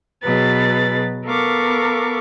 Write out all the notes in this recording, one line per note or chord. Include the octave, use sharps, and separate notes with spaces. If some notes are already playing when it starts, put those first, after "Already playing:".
B2 F#3 G#4 B4 A6
B3 A4 A#4 F5 C#6 D6